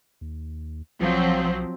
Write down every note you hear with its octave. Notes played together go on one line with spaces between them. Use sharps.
D#2
B1 F3 F#3 C4